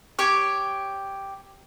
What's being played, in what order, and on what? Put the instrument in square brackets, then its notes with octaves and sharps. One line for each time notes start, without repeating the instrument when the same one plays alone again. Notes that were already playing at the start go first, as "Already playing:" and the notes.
[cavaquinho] G4 C#5 C#6